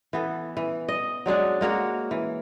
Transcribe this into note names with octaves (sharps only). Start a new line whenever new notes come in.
E3 B3 A4
E3
D#5
F#3 G#3 D4 G#4
G#3 A#3 F#4 C#5
E3